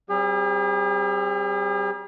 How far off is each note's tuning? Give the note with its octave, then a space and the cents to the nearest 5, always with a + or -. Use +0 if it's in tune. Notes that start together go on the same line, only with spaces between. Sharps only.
G3 -35 C4 +0 G#4 -45